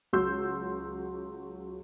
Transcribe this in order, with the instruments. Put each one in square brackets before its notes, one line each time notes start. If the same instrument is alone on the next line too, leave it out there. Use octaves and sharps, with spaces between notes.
[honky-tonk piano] C#2 F#3 F#4 C6 E6 G6